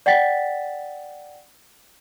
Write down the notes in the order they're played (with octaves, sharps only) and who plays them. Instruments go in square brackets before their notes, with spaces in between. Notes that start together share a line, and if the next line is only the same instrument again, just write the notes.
[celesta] D5 F#5 G5 A6 B6